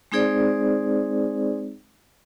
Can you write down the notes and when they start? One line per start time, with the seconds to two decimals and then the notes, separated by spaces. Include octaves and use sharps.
0.12 G#3 C4 D#4 G#4 C5 D5